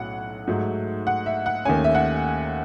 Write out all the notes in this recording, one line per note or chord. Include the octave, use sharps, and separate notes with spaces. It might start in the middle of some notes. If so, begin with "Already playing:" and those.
Already playing: B1 A2 F#3 C#4 F#5
G#2 F#3 A3
F#5
E5
F#5
D#2 D#3 A3 C#4 G#5
E5
F#5